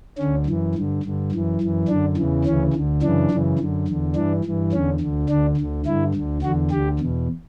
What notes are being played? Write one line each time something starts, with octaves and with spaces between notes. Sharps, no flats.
D2 D3 C#4
F#2 E3
G2 D3
G2 D3
F#2 E3
F#2 E3
F#2 D3 D4
E2 C#3 E3
D2 C#3 E3 C#4
D2 D3
F#2 C#3 E3 D4
F#2 C#3 E3
F#2 D3
E2 D3
G2 E3 D4
G2 E3
E2 D3 C#4
D2 D3
D2 D3 D4
D2 D3
G2 D3 E4
D2 D3
E2 D3 F#4
D2 D3 G4
E2 B2